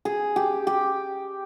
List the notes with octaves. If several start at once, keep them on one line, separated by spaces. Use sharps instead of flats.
G#4
G4
G4